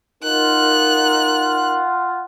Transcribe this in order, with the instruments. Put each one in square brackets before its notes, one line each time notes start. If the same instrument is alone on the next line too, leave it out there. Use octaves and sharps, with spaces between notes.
[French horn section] D#4 A#4 [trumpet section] F4 F#5 [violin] F#6